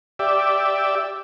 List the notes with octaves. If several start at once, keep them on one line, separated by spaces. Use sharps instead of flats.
G4 D5 E5